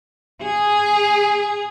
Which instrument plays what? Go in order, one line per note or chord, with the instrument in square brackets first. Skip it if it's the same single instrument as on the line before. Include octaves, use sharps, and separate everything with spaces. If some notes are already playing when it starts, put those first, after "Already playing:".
[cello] G#4